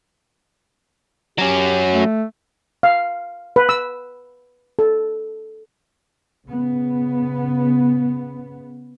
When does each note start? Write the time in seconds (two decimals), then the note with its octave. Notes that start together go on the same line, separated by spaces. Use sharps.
1.39 F#3 C#4 G4
1.92 A3
2.83 F5
3.56 B4
3.69 E6
4.79 A4
6.47 C#3 B3